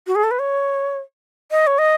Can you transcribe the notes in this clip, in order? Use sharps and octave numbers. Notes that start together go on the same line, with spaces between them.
F#4
G#4
A4
B4
C#5
D#5
C#5
D#5